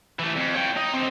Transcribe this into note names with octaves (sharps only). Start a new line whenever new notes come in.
E3 A3
F2
C#5 G5
D#4
D3 C4